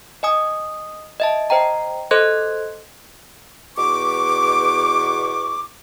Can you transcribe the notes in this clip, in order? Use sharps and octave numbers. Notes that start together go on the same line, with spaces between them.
D#5 G#5 D#6
D#5 E5 A5
C5 D#5 G5 A#5
A4 C5 D#5 C6 F#6 G#6
E2 B2 C#6 D6